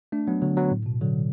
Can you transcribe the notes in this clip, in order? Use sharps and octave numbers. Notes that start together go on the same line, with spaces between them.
A3 D4
F#3 B3
D3 F#3
F#3 B3
A2
B2
D3 F#3